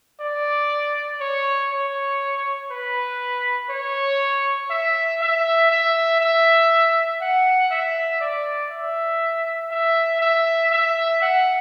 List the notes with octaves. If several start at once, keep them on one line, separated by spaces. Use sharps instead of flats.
D5
C#5
C#5
B4
C#5
E5
E5
E5
E5
F#5
E5
D5
E5
E5
E5
E5
F#5